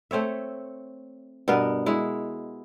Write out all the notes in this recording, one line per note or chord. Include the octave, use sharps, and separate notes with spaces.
A3 C4 C#5 E5
G2 B2 B3 A#4
G#3 E4